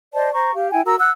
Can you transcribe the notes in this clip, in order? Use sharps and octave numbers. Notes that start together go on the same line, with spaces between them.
C5 D5 D#5 A5
C5 A#5 C#6
G4 F5
E4 G5 G#5
F#4 A#4 A#5 E6
F#5 E6 F#6